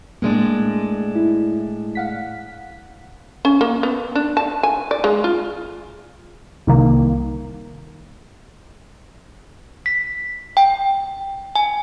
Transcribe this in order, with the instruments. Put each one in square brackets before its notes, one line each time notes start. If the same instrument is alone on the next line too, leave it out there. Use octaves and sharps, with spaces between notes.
[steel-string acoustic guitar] A2 G#3 D4 [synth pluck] A#3
[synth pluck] E4
F5 F#5 B6
[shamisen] C#4
A#3
B3
D4
A5
G#5
D5
G#3
F4
[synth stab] C2 D#3 A#3
[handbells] B6
G5
G#5